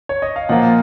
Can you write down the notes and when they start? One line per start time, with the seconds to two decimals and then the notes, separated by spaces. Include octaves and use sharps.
0.09 C#5
0.22 D#5
0.36 F5
0.49 A#2 F3 A#3 F4 D#5 F#5